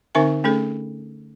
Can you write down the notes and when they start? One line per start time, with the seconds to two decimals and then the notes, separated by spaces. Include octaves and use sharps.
0.15 D3 C4 D#4 A#4 E5 G#5
0.44 A3 C#4 G#4 A4